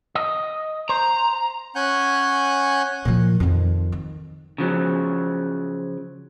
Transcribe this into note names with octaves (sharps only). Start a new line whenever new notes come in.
D#5
C5 A#5
C#4 F#5 G#5 F#6 G6
A#2 F3
F2 D#3
D#3
C#3 F3 F#3